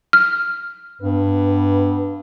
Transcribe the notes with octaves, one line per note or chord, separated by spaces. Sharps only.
F6
G2 B3 B4